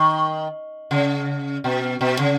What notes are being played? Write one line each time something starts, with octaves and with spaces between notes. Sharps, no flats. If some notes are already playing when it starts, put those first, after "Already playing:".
Already playing: D#3
C#3
B2
B2
C#3